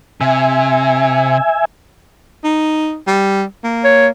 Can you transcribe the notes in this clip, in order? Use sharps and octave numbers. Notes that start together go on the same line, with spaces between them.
C3 E5 G#5
D#4
G3
A#3
C#5